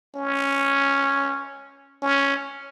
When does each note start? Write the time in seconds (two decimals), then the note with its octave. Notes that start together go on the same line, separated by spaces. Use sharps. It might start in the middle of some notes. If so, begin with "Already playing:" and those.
0.16 C#4
2.02 C#4